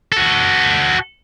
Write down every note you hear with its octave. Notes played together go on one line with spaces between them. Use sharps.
F#4 A4